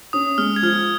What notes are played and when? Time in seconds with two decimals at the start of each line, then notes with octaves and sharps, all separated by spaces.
0.13 C#4 D#6
0.38 G#3 F6
0.56 G#6
0.62 F3 F6